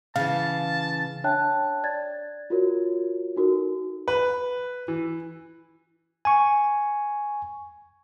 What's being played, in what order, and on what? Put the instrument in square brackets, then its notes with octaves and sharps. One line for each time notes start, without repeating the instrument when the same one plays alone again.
[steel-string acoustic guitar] C#3 E3 [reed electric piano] F5 [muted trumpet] A5
[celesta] D4 C#5 E5 G5 A5 F#6
D5 G#6 A6
F4 F#4 A#4 C#5
D#4 F#4 A4 A#4
[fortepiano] B4
E3
[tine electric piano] G#5 C#6